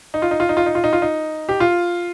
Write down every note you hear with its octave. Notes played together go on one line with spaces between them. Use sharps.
D#4
F4
D#4
F4
D#4
F4
D#4
F4
D#4
F4
D#4
G4
F4